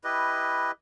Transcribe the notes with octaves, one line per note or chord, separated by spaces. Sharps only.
E4 G4 B4 D#5